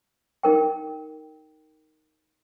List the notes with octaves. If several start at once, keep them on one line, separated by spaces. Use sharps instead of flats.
D#4 A#4 G5